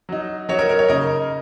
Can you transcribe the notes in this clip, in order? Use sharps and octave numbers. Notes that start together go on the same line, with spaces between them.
F#3 D#4
F#3 D#4 C#5
A#4
A#4
C#5
C#3 A#3 D#4 A#4 D#5